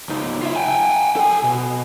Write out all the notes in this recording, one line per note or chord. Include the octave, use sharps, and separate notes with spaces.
C#2 D#4
F4 E5
G5 G#5
A4 G#5
B2